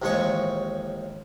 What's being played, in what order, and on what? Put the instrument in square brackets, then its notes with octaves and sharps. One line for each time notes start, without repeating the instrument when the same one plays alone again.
[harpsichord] A1 D#2 F3 G#3 C#5 C#6